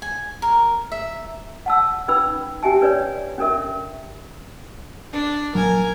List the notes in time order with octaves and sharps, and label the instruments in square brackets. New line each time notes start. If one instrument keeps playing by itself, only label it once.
[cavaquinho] G#5
A#4
E5
[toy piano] F#5 A5 E6
C#4 D#4 B4 B5 E6
C#4 G4 E5 G#5 A5
D4 B4 C#5 D5
C#4 D4 A4 A#4 E5
[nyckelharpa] D4
[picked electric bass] A#1 F#3 [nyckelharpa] A#4 G#5